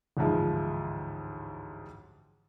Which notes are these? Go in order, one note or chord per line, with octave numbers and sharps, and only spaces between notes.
A1 D2 G#2 F3 G#3